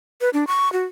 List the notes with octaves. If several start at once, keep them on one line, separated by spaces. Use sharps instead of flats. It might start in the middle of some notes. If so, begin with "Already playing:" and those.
B4
D4
C#6
F#4